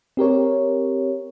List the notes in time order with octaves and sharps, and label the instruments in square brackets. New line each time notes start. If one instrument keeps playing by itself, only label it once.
[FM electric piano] C4 G4 A#4 C#5